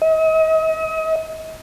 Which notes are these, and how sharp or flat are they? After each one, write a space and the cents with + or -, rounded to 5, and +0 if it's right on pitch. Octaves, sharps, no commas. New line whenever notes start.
D#5 +40